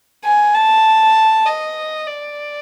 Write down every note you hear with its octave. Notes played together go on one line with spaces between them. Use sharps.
G#5
A5
D#5
D5